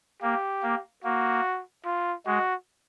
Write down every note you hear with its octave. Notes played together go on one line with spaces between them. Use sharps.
A#3 G4
A#3
A#3 F#4
F4
G#3 F#4